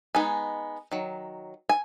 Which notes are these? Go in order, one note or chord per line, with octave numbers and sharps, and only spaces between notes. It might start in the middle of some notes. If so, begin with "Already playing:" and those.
G#3 B3 D#4 G#5
D#3 F#3
G#5